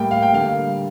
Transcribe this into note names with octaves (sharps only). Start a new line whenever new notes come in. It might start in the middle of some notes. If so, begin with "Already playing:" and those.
Already playing: A2 G3 A#3 G5
F5
G5
D3 G3 A#3 F5